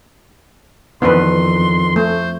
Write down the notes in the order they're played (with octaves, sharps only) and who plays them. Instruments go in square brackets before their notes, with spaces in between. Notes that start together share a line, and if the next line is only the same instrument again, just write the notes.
[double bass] F2 [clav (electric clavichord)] D#3 E3 D4 [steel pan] B3 C4 B4 [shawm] C6
[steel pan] A3 [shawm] C5